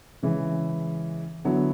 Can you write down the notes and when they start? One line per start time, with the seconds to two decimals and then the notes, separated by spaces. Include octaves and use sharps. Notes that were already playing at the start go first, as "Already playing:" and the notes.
0.23 C#3 E3 G#3 C#4
1.45 D3 F#3 B3 E4